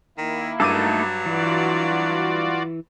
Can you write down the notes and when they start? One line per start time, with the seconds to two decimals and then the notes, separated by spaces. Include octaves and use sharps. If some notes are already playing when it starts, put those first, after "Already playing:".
0.18 D#3 A#3 E4
0.60 G2 F#3 A3 D#4 A4 D6 D#7
1.26 E3 F4 F#4 D5